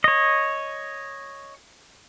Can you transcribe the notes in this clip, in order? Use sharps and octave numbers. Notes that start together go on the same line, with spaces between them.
C#5 D#5